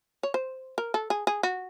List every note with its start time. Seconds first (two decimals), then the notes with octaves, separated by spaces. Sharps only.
0.23 C#5
0.34 C5
0.78 A#4
0.94 A4
1.10 G#4
1.27 G#4
1.43 F#4